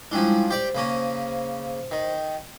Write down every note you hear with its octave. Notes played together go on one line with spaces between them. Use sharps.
F3 G3 G#3 C#4 D4 E4
G4 C5 D5
C#3 A#3 C#4
D#3